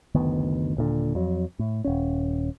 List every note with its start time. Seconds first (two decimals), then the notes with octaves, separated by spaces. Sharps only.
0.15 F#1 D2 D#3 B3
0.77 D#1 A#2 D3
1.15 F2 F#3
1.59 A2
1.85 D#1 C#4